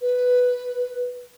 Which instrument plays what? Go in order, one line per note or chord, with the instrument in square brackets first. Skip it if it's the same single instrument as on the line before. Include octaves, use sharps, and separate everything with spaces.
[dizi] B4